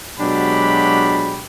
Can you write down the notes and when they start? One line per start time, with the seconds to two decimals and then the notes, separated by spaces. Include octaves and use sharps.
0.20 B2 F#3 G#3 D4 G4 B5